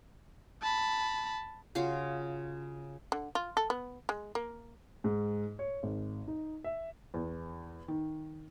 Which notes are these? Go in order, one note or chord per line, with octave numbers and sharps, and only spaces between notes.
A5 B5
C#3 F4 F#4 F5
D3
F4
A4
B3
G#3
A#3
G#2
C#5
G#1
D#4
E5
E2
D#3